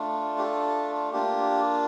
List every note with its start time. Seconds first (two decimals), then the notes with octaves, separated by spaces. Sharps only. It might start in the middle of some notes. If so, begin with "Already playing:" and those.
Already playing: A3 D4 F4
0.38 G4
0.43 A4
1.12 A#3 D4 F4 G4